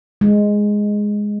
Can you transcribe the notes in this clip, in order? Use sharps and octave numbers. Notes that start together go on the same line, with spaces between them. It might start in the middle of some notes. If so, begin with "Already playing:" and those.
G#3